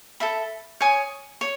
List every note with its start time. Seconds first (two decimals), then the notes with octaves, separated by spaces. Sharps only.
0.20 A4 E5 B5
0.81 C#5 G#5 D#6
1.41 C#5